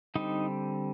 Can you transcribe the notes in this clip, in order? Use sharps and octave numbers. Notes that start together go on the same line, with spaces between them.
D3 G3 C4 D#4